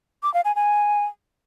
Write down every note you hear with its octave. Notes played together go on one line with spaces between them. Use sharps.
D6
F5
G#5
G#5